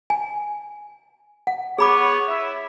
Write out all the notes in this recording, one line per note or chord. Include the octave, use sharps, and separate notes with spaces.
G#5
F#5
B3 G#4 C#5 B5 D6
E4 E5